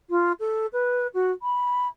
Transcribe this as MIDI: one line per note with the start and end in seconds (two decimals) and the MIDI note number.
0.09 0.32 65
0.39 0.66 69
0.72 1.07 71
1.13 1.31 66
1.42 1.87 83